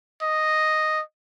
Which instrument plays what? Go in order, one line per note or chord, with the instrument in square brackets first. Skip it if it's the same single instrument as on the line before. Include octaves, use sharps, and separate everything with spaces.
[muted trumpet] D#5